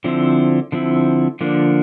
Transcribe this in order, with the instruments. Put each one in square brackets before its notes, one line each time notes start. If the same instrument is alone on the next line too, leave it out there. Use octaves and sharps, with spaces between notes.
[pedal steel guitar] D3 F3 C4 E4
D3 F3 C4 E4
D3 F3 A#3 D4